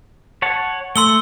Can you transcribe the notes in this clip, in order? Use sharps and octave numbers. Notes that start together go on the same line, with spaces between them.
C#5 F#5 A5
A3 C6 E6 G7